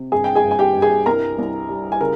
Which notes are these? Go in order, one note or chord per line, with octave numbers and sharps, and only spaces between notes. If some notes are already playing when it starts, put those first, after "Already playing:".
Already playing: C3
G1 G#4 G#5
G5
G#4 G#5
G1
G#5
G4 G5
G1
G#4 G#5
C2 A#4 A#5
C2
G3
G#5
C#3 A#4